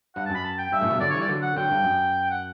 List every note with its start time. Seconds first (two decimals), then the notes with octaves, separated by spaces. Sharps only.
0.15 G2 F#5
0.26 A5
0.30 F#2 B5
0.44 A5
0.58 G5
0.72 G2 E5
0.81 F#2 A2
0.90 G2 B2
1.00 D3 F#3 D5
1.10 C#5
1.14 E3 G3
1.19 D5
1.28 D3 F#3
1.42 F#5
1.56 D3 F#3 G5
1.71 G2
1.84 F#2
2.30 F#5